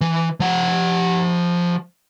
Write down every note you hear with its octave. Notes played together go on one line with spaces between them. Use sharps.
E3
F3 F#5